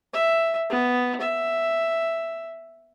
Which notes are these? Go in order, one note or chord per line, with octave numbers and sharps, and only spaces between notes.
E5
B3
E5